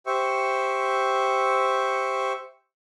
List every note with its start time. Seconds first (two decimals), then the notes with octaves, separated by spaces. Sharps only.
0.06 G4 C5 E5 C#6